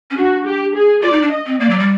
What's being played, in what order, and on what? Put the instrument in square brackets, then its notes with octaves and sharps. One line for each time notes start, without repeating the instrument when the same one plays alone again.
[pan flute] C#4
[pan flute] D4 [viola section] F#4
[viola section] G4
G#4
[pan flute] F4 [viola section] D5
[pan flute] D#4
D4
[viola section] D#5
[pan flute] C4
[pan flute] A#3 [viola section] D5
[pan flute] F#3
G3